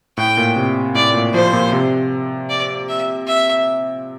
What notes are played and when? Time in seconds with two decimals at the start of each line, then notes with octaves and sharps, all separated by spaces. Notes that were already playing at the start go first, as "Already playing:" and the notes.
0.17 A2 G5
0.37 A#2
0.56 C3
0.95 A2 D5
1.14 A#2
1.34 F3 C5
1.53 A#2
1.72 C3
2.49 D5
2.89 E5
3.27 E5